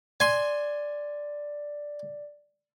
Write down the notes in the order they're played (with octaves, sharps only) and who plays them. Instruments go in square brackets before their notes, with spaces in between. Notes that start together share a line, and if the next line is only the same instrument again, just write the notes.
[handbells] D5 [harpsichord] G#5 C6